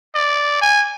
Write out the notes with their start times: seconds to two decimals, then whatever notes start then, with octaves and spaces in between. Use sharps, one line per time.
0.15 D5
0.61 G#5